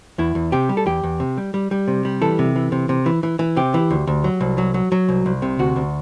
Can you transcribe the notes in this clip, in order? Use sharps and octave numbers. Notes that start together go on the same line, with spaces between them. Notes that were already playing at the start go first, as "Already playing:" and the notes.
E2 E4
E2
C3 G4
G3
A4
E2 G4
E2
C3
G3
G3
G3
C3
G3
E3 A4
C3
E3
C3
C3
E3
E3
E3
C3 G4
E3
D2
D2
F#3
C2
F#3
F#3
F#3
C2
C2
C3
D2 F#4
D2